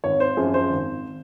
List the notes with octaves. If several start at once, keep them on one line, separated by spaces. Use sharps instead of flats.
G#1 C#5
C5
F#2 F3 G#4
C5
G#1